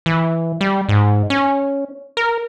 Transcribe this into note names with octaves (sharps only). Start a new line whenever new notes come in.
E3
G3
G#2
C#4
A#4